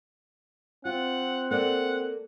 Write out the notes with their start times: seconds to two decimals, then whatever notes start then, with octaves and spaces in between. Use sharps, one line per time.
0.85 C4 F4 F#5
1.51 A#3 A4 D5 F#5